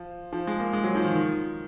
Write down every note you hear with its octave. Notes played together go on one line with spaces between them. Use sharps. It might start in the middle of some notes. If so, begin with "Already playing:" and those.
Already playing: F3
F3
G#3
A#3
G#3
F#3
F3
D#3
D#3